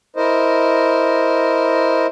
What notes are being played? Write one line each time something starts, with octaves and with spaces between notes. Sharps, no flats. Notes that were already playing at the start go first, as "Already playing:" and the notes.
E4 A#4 C5 D#5